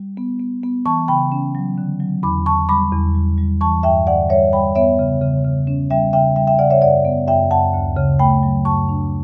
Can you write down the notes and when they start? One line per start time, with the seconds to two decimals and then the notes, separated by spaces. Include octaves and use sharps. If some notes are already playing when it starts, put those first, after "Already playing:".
Already playing: G3
0.17 B3
0.40 B3
0.63 B3
0.86 E3 A5 C#6
1.08 C#3 G5 B5
1.32 C#4
1.55 F#3
1.78 D3
2.00 F#3
2.23 E2 B5 D6
2.46 E2 A5 C#6
2.69 G3 B5 D6
2.93 E2
3.15 G3
3.38 G3
3.61 E3 A5 C#6
3.83 G2 E5 G5
4.07 D3 D5 F#5
4.29 G3 C#5 E5
4.53 G3 G5 B5
4.75 B3 C#5 E5
4.99 C#3
5.21 C#3
5.44 C#3
5.67 C#4
5.90 G3 E5 G5
6.13 C#3 E5 G5
6.36 G3 E5 G5
6.47 E5 G5
6.59 C#3 D5 F#5
6.70 C#5 E5
6.82 F#2 D5 F#5
7.05 B3
7.28 F#2 E5 G5
7.51 F#2 F#5 A5
7.74 D2
7.97 C#3
8.19 A3 G5 B5
8.43 F#3
8.65 F#2 A5 C#6
8.89 D4